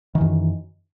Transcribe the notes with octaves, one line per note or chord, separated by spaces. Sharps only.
F#2 D#3 E3